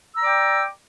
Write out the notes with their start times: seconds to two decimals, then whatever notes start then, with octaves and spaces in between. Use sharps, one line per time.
0.14 E6
0.17 A#5
0.20 D5
0.23 D6
0.26 G5